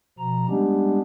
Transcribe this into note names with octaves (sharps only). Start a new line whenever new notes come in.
B2 F3 A#5
G3 G#3 B3 C#4 D4 G4